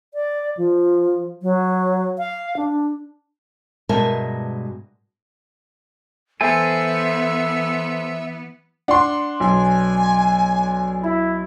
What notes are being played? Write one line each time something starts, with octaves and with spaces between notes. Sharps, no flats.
D5
F3
F#3
F5
D4
G2 B2 G#3 A#4 E5 A5
E3 B3 A4 C5 E5 G#5
D4 F#5 C6
B1 G#5
E4